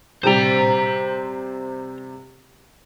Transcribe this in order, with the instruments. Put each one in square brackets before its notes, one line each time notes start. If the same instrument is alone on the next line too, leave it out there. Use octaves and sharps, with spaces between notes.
[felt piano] C3 G3 [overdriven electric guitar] C5 A#5